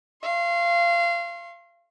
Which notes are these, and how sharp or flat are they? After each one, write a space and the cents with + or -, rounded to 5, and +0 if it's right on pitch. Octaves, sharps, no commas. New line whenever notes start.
F5 -25 C6 +45